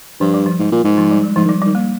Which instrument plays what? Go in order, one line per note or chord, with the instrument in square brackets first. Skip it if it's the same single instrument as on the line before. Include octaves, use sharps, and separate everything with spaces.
[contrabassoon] G2 [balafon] F3
[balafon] G3
F3
[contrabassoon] G#2
A#2
G#2
[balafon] F3
G3
G#3
[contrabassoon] G#2 [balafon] F3
[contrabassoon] D#3
[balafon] G3
[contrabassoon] D#3 [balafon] G3
[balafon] A#3